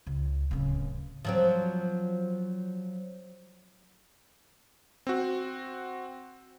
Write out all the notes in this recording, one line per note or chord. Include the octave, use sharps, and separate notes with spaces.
C#2
D1 C#3
F3 F#3 C4
C4 F#4